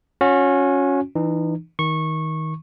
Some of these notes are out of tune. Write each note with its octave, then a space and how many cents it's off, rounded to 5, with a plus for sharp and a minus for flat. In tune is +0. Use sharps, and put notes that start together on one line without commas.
C#4 +0 F#4 -35
E3 +0 D#4 -35
D#3 +25 C#6 -15